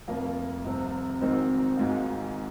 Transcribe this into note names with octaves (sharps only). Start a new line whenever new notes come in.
F1 F2 F3 A#3 F4
C2 C3 F3 C4
G#1 G#2 D#3 C4 D#4
G#1 G#2 G#3 F4